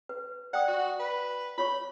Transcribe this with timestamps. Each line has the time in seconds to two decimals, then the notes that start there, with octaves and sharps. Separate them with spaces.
0.09 B4
0.53 D5 F#5 G5 D#6
0.68 F#4
1.00 B4
1.58 F4 C#5 B5 C#6